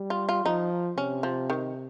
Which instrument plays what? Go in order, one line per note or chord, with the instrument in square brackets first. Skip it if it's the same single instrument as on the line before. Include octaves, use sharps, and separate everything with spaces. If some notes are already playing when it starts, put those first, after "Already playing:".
Already playing: [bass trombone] G3
[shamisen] F4
F4
[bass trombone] F3 [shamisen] D#4
[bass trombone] C3 [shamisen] C#4
[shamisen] F3
D#3